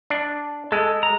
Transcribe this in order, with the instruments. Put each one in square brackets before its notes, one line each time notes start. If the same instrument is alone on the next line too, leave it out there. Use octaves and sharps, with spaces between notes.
[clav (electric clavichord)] D4
[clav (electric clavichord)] G#3 [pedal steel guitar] A4
[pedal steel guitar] A#5